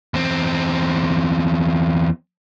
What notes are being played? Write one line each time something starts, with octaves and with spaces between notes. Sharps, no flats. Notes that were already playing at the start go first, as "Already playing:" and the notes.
E2 C4